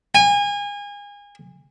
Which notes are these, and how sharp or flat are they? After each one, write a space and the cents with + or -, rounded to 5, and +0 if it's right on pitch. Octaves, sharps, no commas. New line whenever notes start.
G#5 -30